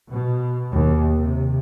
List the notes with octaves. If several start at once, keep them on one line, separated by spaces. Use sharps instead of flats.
B2
D#2
C3